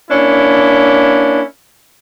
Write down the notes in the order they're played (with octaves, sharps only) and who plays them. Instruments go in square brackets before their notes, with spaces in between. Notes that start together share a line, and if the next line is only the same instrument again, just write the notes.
[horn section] A#3 C#4 D4 E4